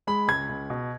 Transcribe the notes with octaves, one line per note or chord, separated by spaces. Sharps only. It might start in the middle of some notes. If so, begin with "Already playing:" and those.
G#3 B5
C#2 G#6
C#2
B2